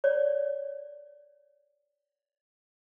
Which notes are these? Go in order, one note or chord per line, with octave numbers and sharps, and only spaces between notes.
C#5 D5